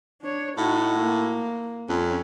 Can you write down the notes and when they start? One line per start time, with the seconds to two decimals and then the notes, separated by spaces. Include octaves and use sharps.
0.22 D4 C#5
0.58 A2 D#4 F#4
0.99 A#3
1.89 F2 C#4